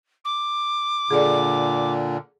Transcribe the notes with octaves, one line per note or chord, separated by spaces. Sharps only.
D6
A#2 D3 G#4 A4 D5